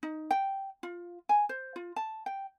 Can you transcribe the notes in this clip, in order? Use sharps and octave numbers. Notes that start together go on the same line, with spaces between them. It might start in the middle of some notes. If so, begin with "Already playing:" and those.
D#4
G5
F4
G#5
C5
F4
A5
G5